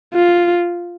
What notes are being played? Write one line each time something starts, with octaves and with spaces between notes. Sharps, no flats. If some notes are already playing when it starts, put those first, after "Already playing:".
F4